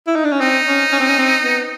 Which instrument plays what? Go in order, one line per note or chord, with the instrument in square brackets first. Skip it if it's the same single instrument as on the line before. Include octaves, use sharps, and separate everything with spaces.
[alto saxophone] E4
D#4
D4
C#4
[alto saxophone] C4 [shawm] D#4
[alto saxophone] C#4
C#4
C4
C#4
C4
B3